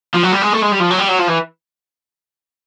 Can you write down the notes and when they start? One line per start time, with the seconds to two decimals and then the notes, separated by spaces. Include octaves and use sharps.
0.15 F3
0.24 F#3
0.33 G3
0.42 G#3
0.53 A3
0.62 G#3
0.72 G3
0.80 F3
0.90 F#3
0.99 G3
1.09 F#3
1.19 F3
1.28 E3